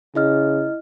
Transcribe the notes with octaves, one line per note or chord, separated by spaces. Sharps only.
C#3 E4 D#5 F6